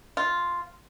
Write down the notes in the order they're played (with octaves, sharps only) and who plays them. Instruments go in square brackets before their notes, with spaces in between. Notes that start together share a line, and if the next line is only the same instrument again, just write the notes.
[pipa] F4